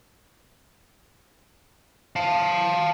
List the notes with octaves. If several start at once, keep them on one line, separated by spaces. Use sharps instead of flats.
F5 A5